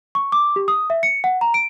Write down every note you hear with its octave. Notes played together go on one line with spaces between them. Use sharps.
C#6
D6
G4
D#6
E5
C#7
F#5
A#5
D7